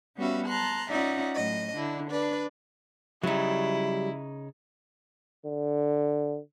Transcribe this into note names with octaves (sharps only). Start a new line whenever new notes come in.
G3 B3 C#4 F#4 E5 F5
A5 A#5 C6 F#6
C#4 D#4 F4 D5 E5 F#5
A2 F#3 D#5
D3 D4 E4
D4 B4 D5
C#3 F#3 G3 D#4 E4
D3